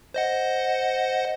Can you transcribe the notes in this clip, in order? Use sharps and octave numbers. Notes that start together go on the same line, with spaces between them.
C5 D#5 F#5